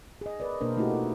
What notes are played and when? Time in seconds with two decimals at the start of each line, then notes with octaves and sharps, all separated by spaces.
0.21 G#4 D#5
0.40 A#4 B4 D5
0.61 B2 A#3 D4 A#4 C5
0.77 A3 D#4 E4 F#4 G4
0.91 A#4